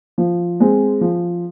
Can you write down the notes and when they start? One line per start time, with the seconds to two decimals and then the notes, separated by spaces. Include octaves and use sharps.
0.18 F3
0.60 G#3 C4
1.01 F3